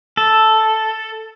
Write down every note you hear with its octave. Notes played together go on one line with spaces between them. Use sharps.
A4